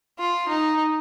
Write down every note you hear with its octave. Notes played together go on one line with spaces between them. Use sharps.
F4
D#4